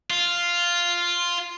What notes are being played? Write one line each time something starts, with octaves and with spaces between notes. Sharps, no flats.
F4